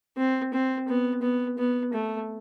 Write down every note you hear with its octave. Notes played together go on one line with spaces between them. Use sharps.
C4
C4
B3
B3
B3
A3